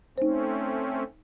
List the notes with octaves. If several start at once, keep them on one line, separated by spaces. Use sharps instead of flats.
A3 C4 C#4 D#4 C5